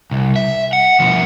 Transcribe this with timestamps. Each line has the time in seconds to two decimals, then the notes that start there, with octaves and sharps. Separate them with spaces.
0.11 C2
0.36 E5
0.73 F#5
1.00 B2 F3